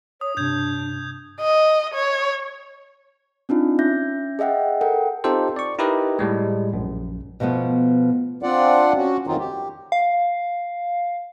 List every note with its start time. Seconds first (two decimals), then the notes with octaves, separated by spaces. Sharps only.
0.21 C#5 D#6
0.37 G2 C3 D4 G6 G#6 F7
1.41 D#5
1.94 C#5
3.49 C4 D4 D#4 F4
3.79 C#4 E5 G6 A#6
4.39 G#4 D#5 E5 F#5 G5
4.81 A4 A#4 F#5 G5
5.24 C4 D#4 F4 G4 A4 C5
5.56 D5 C#6
5.79 D#4 E4 G4 A#4 B4 D#5
6.19 A2 G3 G#3
6.73 A#1 F#2
7.40 B2 F3 A3 B3
8.43 C4 D4 F4 D5 F#5
8.97 C#4 F#4
9.27 F2 D#3 F#3 C4 D#4 F4
9.39 G4
9.92 F5